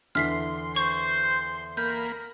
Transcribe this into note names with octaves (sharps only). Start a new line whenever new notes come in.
E2 D3 E4 C6 F6 B6 C7
C5 C#6
A#3 A#4 B5 G6